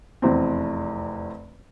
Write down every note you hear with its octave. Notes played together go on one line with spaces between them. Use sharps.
F1 E2 C4